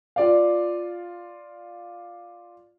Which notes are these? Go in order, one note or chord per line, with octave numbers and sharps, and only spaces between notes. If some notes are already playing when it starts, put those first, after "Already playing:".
F4 D5 F5